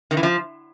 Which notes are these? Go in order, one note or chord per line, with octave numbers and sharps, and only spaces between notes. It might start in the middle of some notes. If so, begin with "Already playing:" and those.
D#3
E3
F3